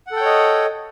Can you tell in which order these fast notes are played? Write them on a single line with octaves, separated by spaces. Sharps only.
F#5 A4 G5 C#5 D#5